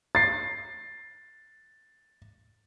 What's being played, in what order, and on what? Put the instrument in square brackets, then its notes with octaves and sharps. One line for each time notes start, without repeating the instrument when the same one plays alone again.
[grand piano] A6 C7